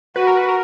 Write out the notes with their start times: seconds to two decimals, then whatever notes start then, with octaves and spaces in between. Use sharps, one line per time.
0.16 F#4 B4
0.27 A#4
0.37 B4
0.49 A#4